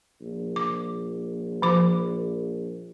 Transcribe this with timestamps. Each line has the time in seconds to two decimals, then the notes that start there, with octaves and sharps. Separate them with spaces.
0.21 A#1
0.56 D6
1.62 F3 D6